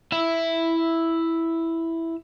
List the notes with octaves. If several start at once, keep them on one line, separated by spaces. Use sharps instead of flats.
E4 E5